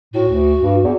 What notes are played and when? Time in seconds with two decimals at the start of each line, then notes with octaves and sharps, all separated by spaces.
0.14 A2 F#4
0.28 D2
0.61 G2
0.84 E2